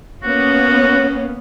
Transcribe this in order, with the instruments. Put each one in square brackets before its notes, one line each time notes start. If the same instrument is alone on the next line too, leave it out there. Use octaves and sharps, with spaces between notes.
[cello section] A#3 B3 C#4 [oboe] F#4